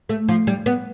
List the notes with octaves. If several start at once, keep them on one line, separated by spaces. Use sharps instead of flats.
A3
F3
G3
B3